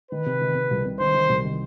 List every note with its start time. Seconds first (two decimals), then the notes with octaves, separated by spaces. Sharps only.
0.11 D#3 B4
0.26 C3
0.41 D#3
0.55 C3
0.71 C2
0.85 C3
1.00 D#3 C5
1.14 D#3
1.29 C2
1.45 D#3